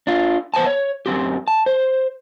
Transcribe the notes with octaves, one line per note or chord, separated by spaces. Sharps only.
D4 F4
B3 C5 G#5 A5
C#5
F#2 F#3 C4 G4
A5
C5